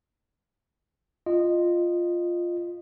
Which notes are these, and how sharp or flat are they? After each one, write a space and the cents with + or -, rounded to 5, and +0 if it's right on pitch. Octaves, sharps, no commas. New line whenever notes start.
F4 +0 D#5 -15